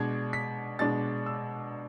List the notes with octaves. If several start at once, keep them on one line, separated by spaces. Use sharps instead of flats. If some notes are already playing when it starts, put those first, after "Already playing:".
Already playing: B2 G#3 D4 G#6
B6
B2 G#3 D4 A6
E6